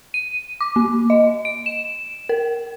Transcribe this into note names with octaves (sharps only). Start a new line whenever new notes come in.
D#7
D6
A#3
D#5
D7
E7
A#4